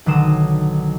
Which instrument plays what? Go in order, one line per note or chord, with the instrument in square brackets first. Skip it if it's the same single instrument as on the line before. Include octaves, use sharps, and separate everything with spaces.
[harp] B1 D3 D#3 D#6 E7